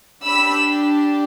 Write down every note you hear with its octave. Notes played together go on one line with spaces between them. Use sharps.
D4 G4 B5 E6